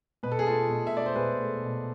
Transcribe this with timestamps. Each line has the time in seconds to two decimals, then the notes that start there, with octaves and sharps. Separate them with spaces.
0.23 B2 B4
0.32 A4
0.39 G#4
0.46 A3 F4 A4
0.70 B2
0.87 E5
0.92 A3 D5
1.06 C5
1.15 B2 G#4 B4
1.39 A3
1.62 B2